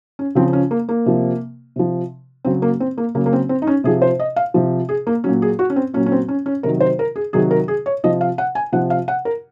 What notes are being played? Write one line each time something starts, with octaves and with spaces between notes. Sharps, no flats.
C#4
C#3 F3 C4
C#4
A#3
A#3
C3 F3
C3 F3
C#3 F#3 C4
A#3
C4
A#3
C#3 F#3 A#3
A#3
C4
C4
D#4
C#4
C3 F3 G#4
C5
D#5
F5
C3 F3
G#4
A#3
A#2 F#3 C#4
G#4
F#4
C#4
C4
A#2 F#3 C#4
C#4
C4
C#4
C#4
C3 D#3 F#3 A#4
C5
A#4
G#4
C3 D#3 F#3 G#4
A#4
G#4
C#5
C3 F3 D#5
F5
F#5
G#5
C3 F3 F#5
F5
F#5
A#4